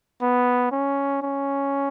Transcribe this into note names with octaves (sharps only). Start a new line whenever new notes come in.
B3
C#4
C#4